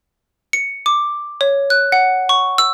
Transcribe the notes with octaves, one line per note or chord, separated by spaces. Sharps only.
C#7
D6
C#5
F#6
F#5
C#6
E6